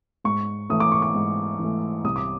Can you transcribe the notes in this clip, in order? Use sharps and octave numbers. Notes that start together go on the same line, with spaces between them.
G#2 C#6
E3 A3 D#6
D6
C#6
D6
G#2
E3 A3
C2 D#6
D6